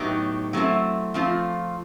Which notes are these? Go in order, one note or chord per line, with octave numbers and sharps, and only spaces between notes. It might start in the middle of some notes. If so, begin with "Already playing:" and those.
Already playing: A2 F#3 B3 D#4 G4
F#3 A3 C4 E4
F3 A3 C4 F4